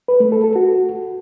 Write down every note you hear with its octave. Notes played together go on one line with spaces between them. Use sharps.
B4
A3
A4
A4
F#4